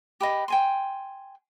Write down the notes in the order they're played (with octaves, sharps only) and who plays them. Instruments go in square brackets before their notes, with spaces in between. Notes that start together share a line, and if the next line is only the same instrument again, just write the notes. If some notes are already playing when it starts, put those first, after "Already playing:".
[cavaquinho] G4 B4 D#5
G5 G#5 C6